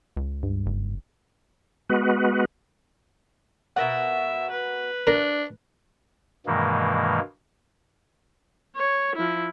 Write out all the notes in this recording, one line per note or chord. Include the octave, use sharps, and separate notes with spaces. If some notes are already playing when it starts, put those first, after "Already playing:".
C#2
G2
F#1
G#3 B3 F#4 B4
B2 A#4 E5 F#5
B4
D4 A#4
G2 B2 D#3 E3 G#3 A#3
C#5
F3 E4